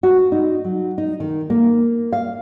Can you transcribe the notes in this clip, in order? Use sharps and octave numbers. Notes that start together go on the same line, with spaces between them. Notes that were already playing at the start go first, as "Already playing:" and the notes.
F#4
D#4
F#3
D#4
D#3
A#3
F5